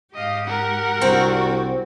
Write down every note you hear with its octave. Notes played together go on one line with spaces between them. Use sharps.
G#2 G4 D#5 F5
A#4 F#5
C2 C4 D4 F#4